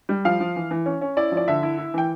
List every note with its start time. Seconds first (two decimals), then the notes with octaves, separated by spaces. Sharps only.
0.09 G3
0.25 F3 F5
0.40 F3
0.56 E3
0.71 E3
0.86 C#4
1.01 C#4
1.17 E4 D5
1.32 F3
1.37 D5
1.48 D3 E5
1.63 E4
1.78 E4
1.94 E3 G5